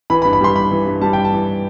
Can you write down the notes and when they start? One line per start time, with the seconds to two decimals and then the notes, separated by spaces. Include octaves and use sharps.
0.10 E3 B5
0.22 B5
0.25 G2
0.33 B5
0.41 G3 C6
0.55 G2 B5
0.71 E3
0.86 G2
1.01 G3 A5
1.13 G2 G5
1.25 A5
1.32 E3